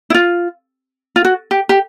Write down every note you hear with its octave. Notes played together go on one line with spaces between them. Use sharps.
E4
F4
F4
F#4
G4
G4